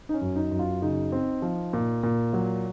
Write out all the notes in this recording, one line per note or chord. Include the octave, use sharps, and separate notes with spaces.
D#4
C#4
F#2
D#4
F#2
F4
C#3 D#4
C4
F3
A#2
A#2
F#3